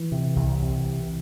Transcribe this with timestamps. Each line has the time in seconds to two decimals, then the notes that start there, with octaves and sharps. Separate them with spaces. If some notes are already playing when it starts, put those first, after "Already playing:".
Already playing: E3
0.12 C3
0.36 C2
0.63 C3